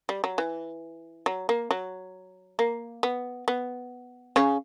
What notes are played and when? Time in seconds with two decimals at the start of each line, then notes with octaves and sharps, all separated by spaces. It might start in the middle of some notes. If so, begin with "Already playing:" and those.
0.09 G3
0.24 F#3
0.38 E3
1.26 F#3
1.49 A#3
1.71 F#3
2.59 A#3
3.03 B3
3.48 B3
4.36 C#3 C#4